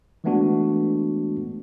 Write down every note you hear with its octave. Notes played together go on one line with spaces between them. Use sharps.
E3 G#3 A3 B3 D4 F#4